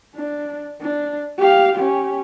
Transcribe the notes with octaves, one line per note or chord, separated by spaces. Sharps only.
D4
D4
G4 F5
C#4 G4